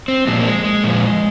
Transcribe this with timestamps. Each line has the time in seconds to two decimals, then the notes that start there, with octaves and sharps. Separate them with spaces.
0.08 C4
0.27 A#2 F3 G#3
0.40 A#3
0.46 G#3
0.64 G#3
0.84 A#2 F3